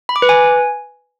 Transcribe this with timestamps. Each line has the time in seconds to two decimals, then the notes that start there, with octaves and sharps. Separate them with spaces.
0.09 B5
0.16 D6
0.22 B4
0.29 G#5